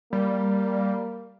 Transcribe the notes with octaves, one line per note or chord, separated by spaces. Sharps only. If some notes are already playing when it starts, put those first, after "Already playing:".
G3 A#3